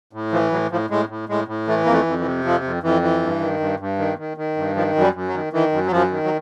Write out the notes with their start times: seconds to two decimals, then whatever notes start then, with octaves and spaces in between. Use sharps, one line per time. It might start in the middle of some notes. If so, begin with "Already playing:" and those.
0.13 A2
0.32 E3 F3
0.52 A2 F#3
0.71 A2 F3
0.90 A2 G#3
1.09 A2
1.29 A2 G#3
1.48 A2
1.67 E3 A3
1.85 F2 A#3
1.93 A3
2.06 F2
2.19 E3
2.25 C3
2.44 F2 F3
2.64 F2
2.83 F2 E3
3.02 E3
3.22 G2
3.40 D#3
3.60 G2
3.80 G2
3.98 D#3
4.18 D#3
4.37 D#3
4.56 G2
4.76 D#3 F3
4.95 F#2
5.01 G3
5.14 F#2
5.28 F#3
5.34 D#3
5.53 D#3 E3
5.72 F#2
5.86 F#3
5.91 F#2 F3
6.11 D#3
6.24 F#3